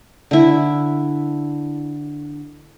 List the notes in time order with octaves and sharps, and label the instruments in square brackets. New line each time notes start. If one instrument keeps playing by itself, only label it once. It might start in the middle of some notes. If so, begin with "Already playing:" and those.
[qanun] D3 E4